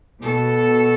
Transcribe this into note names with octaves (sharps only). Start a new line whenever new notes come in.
B2 A4